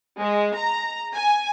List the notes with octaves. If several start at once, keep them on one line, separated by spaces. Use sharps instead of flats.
G#3
A#5
G#5